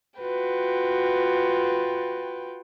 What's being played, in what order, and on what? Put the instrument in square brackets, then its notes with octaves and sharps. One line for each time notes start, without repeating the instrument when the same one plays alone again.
[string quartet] F4 F#4 B4 G5